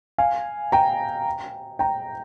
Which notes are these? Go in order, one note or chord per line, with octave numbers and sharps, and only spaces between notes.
F5 G#5
G5 A#5
G5 A#5